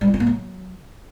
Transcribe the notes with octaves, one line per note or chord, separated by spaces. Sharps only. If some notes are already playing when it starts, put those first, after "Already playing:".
G3
F4
C#4
A#3
F#3